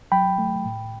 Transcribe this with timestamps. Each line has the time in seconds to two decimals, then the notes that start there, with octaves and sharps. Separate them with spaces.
0.12 F#3 G5 B5
0.38 A3
0.65 A2